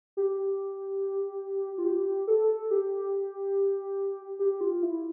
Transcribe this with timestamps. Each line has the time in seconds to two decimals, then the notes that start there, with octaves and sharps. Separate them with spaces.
0.17 G4
1.78 F4
1.85 G4
2.27 A4
2.71 G4
4.39 G4
4.61 F4
4.82 E4